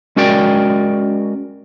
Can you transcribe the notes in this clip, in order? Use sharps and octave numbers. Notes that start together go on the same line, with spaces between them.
G#3 C#4 F#4 A#4 D5 G5